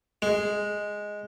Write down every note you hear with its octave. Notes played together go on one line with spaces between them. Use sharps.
G#3